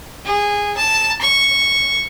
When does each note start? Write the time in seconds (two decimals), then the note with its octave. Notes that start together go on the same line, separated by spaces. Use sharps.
0.25 G#4
0.77 A5
1.21 C#6